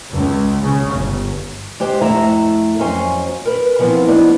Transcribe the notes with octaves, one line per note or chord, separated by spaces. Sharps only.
C#2
C#3
G1
G#3 G4 C5
F2 A2 A3 E4 E5 A#5
F2 F#3 C#4 C5 G#5
A#4 B4
E3 F3 A3 B3 C4 E4
F3 A#3 B3 D4 D#4